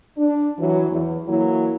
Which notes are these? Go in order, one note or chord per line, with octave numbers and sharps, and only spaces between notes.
D4
E3 F#3
E2
E3 F#3 A#3 E4